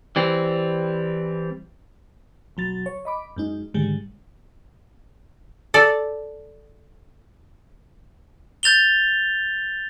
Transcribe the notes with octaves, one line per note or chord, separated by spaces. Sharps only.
E3 G3 C4
B1 F#3 A6
C#5
D#5 B5 D6
F#2 G#3 D#4
G#2 D3 D#3 G3 G#3
A4 D5
G6 A6 F7 G7